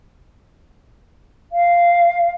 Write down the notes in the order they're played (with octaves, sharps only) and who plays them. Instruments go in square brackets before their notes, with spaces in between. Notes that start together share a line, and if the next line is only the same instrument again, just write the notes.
[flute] F5